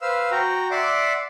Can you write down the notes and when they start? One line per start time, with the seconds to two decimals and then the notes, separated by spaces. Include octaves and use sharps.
0.02 B4 C5 F5 E6
0.31 F#4 G5 A#5
0.71 D5 E5 F#5 C6 D6